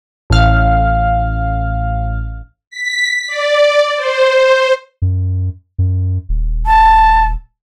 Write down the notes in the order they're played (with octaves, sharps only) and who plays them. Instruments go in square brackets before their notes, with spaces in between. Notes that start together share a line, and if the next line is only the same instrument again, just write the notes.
[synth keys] A1 F5
[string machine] B6
D5
C5
[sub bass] F#2
F#2
D#1
[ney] A5